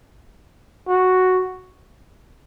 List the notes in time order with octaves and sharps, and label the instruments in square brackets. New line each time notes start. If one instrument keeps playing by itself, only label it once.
[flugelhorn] F#4